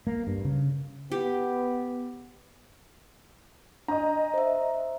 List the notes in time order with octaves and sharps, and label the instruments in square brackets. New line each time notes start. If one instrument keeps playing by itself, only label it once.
[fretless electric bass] A#3
G2
C#3
[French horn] B3 [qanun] G4
[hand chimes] D4 [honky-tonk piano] D#5 A#5
[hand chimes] C5 E5